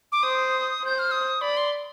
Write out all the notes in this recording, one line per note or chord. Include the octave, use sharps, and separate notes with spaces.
D6
C5 D#6
C5 G6
F6
D#6
D5 B5
C6